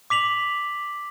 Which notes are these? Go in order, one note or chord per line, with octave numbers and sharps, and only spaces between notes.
D6 B6 F7 F#7